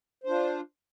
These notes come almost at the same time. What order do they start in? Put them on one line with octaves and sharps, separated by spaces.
C5 D4 F4